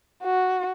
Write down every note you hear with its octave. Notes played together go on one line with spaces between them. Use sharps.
F#4